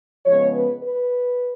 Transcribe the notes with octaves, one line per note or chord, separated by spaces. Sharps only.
C#3 F3 G#3 B3 C#5
B4
B4